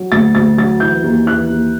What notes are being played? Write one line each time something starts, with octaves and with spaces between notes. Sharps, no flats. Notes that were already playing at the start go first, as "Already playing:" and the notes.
Already playing: F#3
D2 A6
D2 A6
F#3 A6
E3 G6
D#2
E3 F#6
D#2